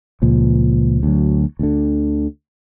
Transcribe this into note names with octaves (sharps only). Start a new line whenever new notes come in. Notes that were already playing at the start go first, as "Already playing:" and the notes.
C#2 A#2 F3
D2 F#3
D2 D3